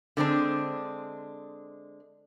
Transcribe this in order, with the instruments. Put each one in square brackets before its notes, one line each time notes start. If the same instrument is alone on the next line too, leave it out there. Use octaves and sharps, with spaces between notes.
[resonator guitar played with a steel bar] D3 G#3 C4 D4